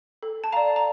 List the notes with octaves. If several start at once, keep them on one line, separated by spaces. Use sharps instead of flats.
A4
A5
D5 F5 A#5
A#5